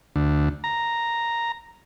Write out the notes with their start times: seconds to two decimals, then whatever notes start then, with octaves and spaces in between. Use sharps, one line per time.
0.16 D2
0.64 A#5